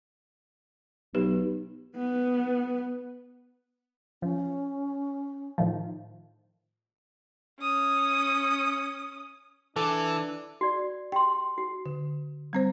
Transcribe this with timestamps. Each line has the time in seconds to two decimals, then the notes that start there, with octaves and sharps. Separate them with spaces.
1.15 B1 G4 B4
1.96 B3
4.22 F3 C#4
5.58 A2 D#3 F3
7.60 C#4 D#6
9.76 E3 D4 A4 D6
10.61 F#4 D5
11.12 G4 G5 C6
11.58 F#4
11.86 D3
12.53 G3 C4 C5